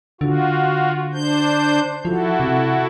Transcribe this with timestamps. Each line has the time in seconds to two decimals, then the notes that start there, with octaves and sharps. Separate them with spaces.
0.21 D3 F4 F#4
1.13 D4 C5 G6
2.05 F3 E4 F#4 A4
2.40 C3